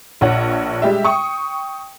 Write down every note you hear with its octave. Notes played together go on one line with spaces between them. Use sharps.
A#1 C#5 F#5
G3 G#3 G4 E5
G5 C#6 D#6